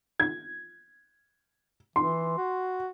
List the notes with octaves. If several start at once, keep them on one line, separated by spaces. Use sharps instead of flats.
G#6
E3 C6
F#4